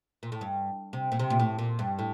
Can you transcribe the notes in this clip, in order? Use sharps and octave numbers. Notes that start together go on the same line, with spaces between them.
A#2
A2
G2
C3
A#2
C3
A#2
A2
A#2
G2
A2